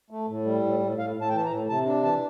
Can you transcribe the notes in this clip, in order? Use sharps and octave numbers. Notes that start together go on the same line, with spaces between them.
A3
A2
G3
A2
A2
A2 F5
A2
A5
G5
E3 A5
A#5
A2
C3 A5
D4
E3 A5